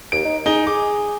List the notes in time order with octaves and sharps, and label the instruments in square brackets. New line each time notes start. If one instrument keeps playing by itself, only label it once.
[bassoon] D#2 [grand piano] D7
[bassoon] D#4
[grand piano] D#4 G7 [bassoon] G#4
[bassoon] G#4 [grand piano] D6